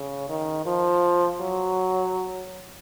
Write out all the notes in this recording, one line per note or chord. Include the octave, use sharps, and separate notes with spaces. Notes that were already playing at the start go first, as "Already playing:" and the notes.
Already playing: C#3
D#3
F3
F#3